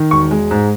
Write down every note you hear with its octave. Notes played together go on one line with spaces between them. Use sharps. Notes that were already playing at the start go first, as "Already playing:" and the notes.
Already playing: D#3
E1 C#6
G#3
G#2